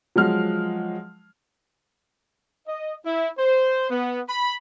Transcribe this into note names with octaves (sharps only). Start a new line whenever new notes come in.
F3 F#3 G#3 F6
D#5
E4
C5
B3
B5